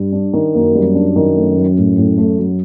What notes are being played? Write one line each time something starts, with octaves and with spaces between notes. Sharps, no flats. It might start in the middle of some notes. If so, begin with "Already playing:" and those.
Already playing: G2 G3
D4
D#3
F#2 A#3
G3
D4
D#3
A3
F#3
A2
A2
A3
F#3